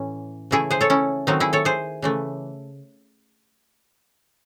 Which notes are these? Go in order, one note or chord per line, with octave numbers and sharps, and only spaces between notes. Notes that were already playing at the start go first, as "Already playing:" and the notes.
Already playing: A2 E3 C#4
C#3 E3 A3 E4 G#4
G#4 C5
A4 C#5
C#4 E4
D#3 F#3 A3 C4 D#4
E4 G#4
A4 C#5
G#4 C5
C#3 E3 A3